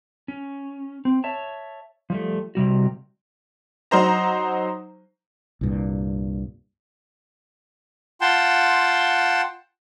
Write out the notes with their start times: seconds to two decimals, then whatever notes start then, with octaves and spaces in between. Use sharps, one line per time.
0.28 C#4
1.05 C4
1.24 C#5 E5 A5
2.10 F3 G3 A3
2.55 C3 G3 F#4
3.91 F#3 D#4 C5 A#5
5.61 C2 G2 A#2
8.21 F4 F#5 G5 A5 C6